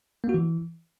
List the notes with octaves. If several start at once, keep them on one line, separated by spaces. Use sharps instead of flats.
A#3
F#4
E3